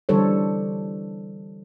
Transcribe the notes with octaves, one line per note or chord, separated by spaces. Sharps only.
D3 E3 G3 A4 C5 C#5